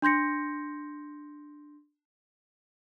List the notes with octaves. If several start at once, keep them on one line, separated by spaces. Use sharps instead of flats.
D4 C6 G6 A#6 C#7